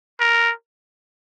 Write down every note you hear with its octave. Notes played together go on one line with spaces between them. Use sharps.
A#4